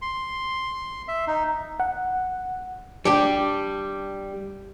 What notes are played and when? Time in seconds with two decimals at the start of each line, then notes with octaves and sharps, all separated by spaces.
0.02 C6
1.08 E5
1.27 D#4
1.80 F#5
3.05 G3 D4 G4